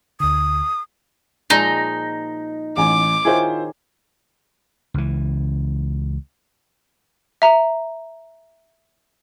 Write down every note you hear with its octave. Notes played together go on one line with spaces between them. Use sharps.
D2 D3 D#6
A#2 F3 G#3 D#4 A#6
A1 G#5 D6
D#3 C#4 E4 F4 G#4 C5
C#2 E3
E5 A#5